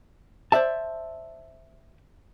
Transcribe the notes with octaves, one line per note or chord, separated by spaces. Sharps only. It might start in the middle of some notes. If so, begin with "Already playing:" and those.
C5 D5 E5 A5